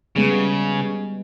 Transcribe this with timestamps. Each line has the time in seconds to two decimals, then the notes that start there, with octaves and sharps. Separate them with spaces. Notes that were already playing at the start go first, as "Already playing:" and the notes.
0.16 C#3 G3 G#3 B3